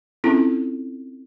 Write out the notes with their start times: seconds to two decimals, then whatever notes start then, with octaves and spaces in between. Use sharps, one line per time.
0.24 C4 C#4 E4 F4 A4